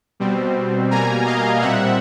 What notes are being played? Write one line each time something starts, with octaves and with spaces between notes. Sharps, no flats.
B2 G3 C4
B2 G3 A#3 G#5 A#5
D#5 F5
A#2 G3 C4 E5 F#5